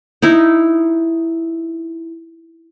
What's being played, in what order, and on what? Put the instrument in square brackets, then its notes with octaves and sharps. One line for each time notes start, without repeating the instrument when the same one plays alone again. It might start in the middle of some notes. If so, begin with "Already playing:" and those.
[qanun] D#4 E4